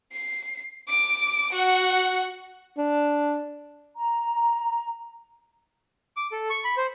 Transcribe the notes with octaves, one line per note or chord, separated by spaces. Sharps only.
C7
D6 D7
F#4 F#5
D4
A#5
D6
A4
C#6
B5
C5